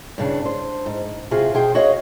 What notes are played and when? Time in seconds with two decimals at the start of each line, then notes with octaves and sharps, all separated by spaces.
0.18 G2 C#3 D4
0.46 C5
0.86 G#2
1.31 C3 F4 F#4 G#4
1.54 B2 G#4 C5 G5
1.75 F#4 C#5 D#5 F5